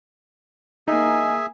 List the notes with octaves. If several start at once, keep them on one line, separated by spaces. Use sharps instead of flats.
A#3 D#4 G#4 E5 G#5